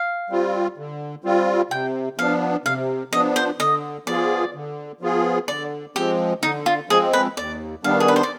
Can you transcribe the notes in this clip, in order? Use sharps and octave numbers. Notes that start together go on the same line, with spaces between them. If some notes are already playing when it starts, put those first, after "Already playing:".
Already playing: F5
G3 C4 F4
D3
G3 C4 F4
C3 G5
F3 B3 D4 F5
C3 F5
F3 B3 D4 D#5
C5
D3 D#5
F3 B3 F4 G#4 D5
D3
F3 B3 F4 G#4
D3 D5
F3 G#3 C4 G4
D3 D#4
F4
F3 G#3 C4 G#4
B4
D#2 D5
D#3 G3 B3 D4 F5
G#4
B4
C5
D5